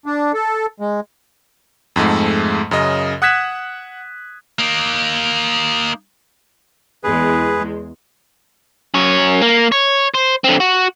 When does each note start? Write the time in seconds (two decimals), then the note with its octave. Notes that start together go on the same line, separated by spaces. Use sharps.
0.06 D4
0.34 A4
0.80 G#3
1.96 F2 G#2 G#3 A3
2.71 F#2 C#3 D#5
3.22 F#5 D#6 F#6 G#6 B6 E7
4.59 A#3 D#4
7.04 E2 G#3 G#4 B4
8.95 F#2 C#5
9.42 A#3
9.72 C#5
10.14 C5
10.44 D3 C4
10.60 F#4